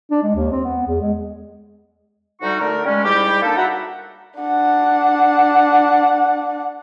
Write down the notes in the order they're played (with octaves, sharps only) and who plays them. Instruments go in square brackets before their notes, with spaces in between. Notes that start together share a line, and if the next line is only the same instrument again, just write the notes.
[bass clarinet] D4
G#3
D#2
C4
B3
E2
G#3
[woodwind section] D2 G3 D#4 F#4 C#6
D3 A3 A#4
G3 G#3 C#4
G#2 G3 E4 G4
A#3 D4 D#4 A4
F#4 E5 F#5 A#5 B5
[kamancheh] D4 F#5